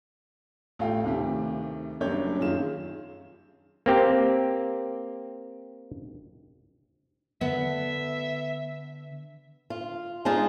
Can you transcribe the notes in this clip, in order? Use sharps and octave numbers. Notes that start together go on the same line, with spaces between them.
A1 A3 F4 F5 G5
D2 C3 D#3 G4
F#1 F#2 G3 D4 C#5 G6
F#2 D#3 F4 G#4 E7
A#3 C4 G4
D3 B3 E5
F4
G#3 D4 D#4 F4 G#4